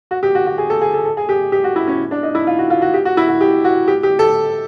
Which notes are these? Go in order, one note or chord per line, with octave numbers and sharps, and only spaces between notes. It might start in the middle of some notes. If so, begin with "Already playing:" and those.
F#4
G4
F#4
F#4
G#4
A4
G#4
A4
A4
G#4
G4
G4
F#4
E4
C#4
D4
D#4
E4
F4
F#4
F4
F#4
G4
F#4
E4
F#4
G4
F#4
G4
G4
A4